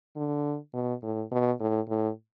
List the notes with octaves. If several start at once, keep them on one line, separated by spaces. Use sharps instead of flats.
D3
B2
A2
B2
A2
A2